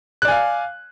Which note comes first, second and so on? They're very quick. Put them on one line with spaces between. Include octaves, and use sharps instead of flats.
F#6 D5 G#5 F5